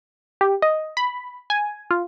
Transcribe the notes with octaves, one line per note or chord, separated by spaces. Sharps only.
G4
D#5
B5
G#5
F4